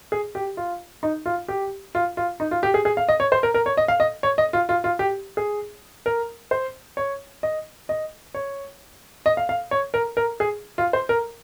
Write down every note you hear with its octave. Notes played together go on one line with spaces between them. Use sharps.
G#4
G4
F4
D#4
F4
G4
F4
F4
D#4
F4
G4
G#4
G#4
F5
D#5
C#5
C5
A#4
A#4
C#5
D#5
F5
D#5
C#5
D#5
F4
F4
F4
G4
G#4
A#4
C5
C#5
D#5
D#5
C#5
D#5
F5
F5
C#5
A#4
A#4
G#4
F4
C5
A#4